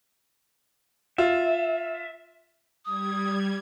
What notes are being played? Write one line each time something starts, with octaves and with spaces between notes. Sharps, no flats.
F4 E5
G3 D#6 G#6